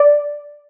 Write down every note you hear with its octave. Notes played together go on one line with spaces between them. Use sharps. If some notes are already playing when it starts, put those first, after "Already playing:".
Already playing: D5